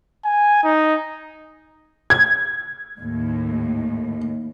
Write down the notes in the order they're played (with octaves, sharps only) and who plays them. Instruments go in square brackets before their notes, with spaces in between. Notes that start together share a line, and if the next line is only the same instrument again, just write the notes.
[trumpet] G#5
D#4
[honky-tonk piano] G#6
[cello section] D#2 A2